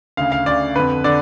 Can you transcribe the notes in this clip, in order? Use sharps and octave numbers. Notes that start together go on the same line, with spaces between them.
D2 C#3 F5
F5
D2 C#3 D5
F2 D3 B4
D3 D5